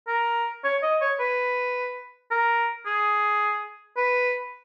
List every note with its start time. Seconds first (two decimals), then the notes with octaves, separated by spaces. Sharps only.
0.08 A#4
0.64 C#5
0.82 D#5
1.01 C#5
1.20 B4
2.31 A#4
2.86 G#4
3.97 B4